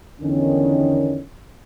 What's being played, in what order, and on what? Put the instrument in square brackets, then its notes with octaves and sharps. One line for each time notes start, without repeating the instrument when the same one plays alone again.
[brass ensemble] E2 D3 D#3 C#4